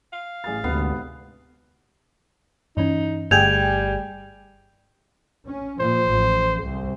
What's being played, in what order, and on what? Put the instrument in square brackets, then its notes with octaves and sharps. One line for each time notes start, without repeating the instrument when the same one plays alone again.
[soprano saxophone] F5
[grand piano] A1 G#4 A6
[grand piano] G#1 C3 C7 [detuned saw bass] D2 [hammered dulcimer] B3
[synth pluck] G2 E3 C#4 [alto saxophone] D#4
[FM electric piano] G1 G#4 G5 [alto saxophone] G3 [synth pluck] A3 [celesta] G6 G#6 F7
[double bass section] C#4
[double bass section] A#2 F3 [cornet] C5
[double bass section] A1
C2